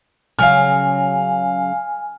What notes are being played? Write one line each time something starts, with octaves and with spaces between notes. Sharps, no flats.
C#3 F#3 C#4 F5 G#5 F6